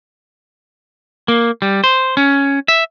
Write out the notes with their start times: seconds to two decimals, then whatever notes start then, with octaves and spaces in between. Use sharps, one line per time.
1.28 A#3
1.62 G3
1.84 C5
2.17 C#4
2.68 E5